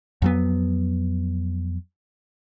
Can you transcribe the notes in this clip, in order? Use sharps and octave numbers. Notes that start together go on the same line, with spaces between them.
F2 F#3 B3